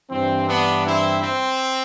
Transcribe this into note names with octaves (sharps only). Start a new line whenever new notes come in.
G2 E3 G3 C4
B3 D4
C4 E4
C4